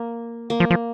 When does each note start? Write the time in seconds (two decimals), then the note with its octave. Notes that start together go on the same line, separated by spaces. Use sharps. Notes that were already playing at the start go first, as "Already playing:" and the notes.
Already playing: A#3
0.50 A#3
0.60 F3
0.70 F3